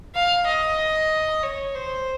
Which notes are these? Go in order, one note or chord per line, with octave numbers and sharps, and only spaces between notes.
F5
D#5
C#5
C5